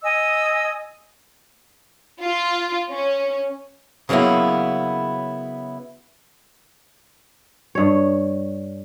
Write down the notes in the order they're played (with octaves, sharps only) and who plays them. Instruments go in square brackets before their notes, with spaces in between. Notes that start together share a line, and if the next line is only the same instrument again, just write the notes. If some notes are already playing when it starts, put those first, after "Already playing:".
[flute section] D#5 G#5 D#6 E6
[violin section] F4
C#4
[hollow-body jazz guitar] C#3 F#3 A#3 B3 E4
[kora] G2 C#5